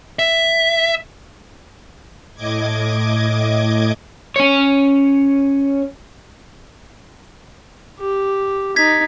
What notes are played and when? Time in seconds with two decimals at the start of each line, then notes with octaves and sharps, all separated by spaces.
0.19 E5
2.35 A2 D#5 D6 G#6
4.36 C#4 C#5
8.00 G4
8.76 D#4 G#6 B6